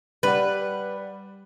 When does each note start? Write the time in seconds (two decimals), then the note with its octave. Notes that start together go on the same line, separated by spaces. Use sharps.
0.23 G3 B4 D5 F#5